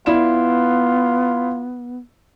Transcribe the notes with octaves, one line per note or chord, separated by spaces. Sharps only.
B3 E4 F4 D5 E7